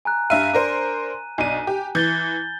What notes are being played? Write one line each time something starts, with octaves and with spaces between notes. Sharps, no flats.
G#5 A#5 F#6
G2 E5 F5 D#7
D4 A#4 C5
B1 D4 G#5 D#7
G4
E3 G6 A6 G7